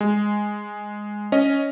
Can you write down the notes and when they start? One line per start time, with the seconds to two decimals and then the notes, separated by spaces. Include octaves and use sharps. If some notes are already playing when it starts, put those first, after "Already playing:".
0.01 G#3
1.32 C#4 D#5